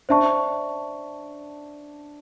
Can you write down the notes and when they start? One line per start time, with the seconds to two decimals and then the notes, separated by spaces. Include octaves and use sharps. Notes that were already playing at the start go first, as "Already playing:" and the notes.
0.09 D4 C5 E5 A5 C#6